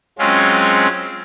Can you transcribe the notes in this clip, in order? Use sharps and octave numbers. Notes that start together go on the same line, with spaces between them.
F#3 G#3 C4 C#4 F4